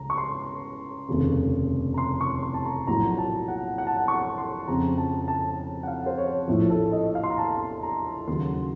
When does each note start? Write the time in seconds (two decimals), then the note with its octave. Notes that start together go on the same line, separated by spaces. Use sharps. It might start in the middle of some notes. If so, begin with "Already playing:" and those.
Already playing: C#2 C#3 A#5
0.10 C#6
0.18 C6
1.09 F1 D#2 C#3
1.94 A#5
1.98 C6
2.21 C#6
2.43 C6
2.54 A5
2.65 A#5
2.87 A#1 A2 F#3 A#5
3.18 A5
3.48 F#5
3.78 F#5
3.87 A5
3.97 F#5
4.08 C#6
4.38 C6
4.68 F2 C#3 F3 A#5
4.98 A5
5.28 A5
5.83 F#5
5.88 F5
6.06 C5
6.18 C#5
6.48 A#1 A2 F3
6.70 A4
6.92 D#5
7.15 F5
7.24 C6
7.30 A#5
7.38 A5
7.83 A#5
8.27 D#2 C#3 F#3 C6